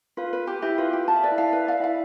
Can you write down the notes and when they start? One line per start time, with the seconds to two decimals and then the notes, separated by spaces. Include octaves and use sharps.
0.17 F4 B4 F5
0.33 B4
0.47 G4
0.62 E4 G4 E5
0.78 F4 B4 F5
0.93 G4
1.08 F5 A5
1.16 E5
1.23 B4 D5
1.32 E4 E5
1.38 F5
1.53 B4 E5
1.67 D5 F5
1.80 E4 E5 F5